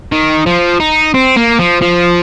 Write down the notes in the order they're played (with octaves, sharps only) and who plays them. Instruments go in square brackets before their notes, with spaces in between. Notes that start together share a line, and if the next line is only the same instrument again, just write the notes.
[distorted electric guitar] D#3
F3
D#4
C4
A#3
F3
F3